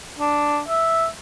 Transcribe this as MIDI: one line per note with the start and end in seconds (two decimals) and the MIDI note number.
0.19 0.60 62
0.68 1.07 76